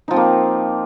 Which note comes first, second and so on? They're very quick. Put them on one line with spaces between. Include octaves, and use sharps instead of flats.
D#4 F3 C4 A#3